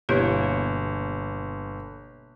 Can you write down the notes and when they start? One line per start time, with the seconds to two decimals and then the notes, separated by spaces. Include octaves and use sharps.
0.09 G1 B2 A#3 E4 G4 B4 C#5